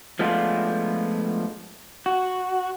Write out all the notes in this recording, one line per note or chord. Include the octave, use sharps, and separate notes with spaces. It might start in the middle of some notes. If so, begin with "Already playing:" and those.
F3 G#3 A3 B3 D4 F4
F#4